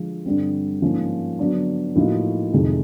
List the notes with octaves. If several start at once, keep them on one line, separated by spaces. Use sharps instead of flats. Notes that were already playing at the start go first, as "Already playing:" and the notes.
Already playing: D3 F3 G#3
G2 D3 G3 C4
G#2 F3 A#3 C#4
D3 F#3 B3 D4
A2 F3 A#3 D#4 F#4
F2 C3 D#3 G#3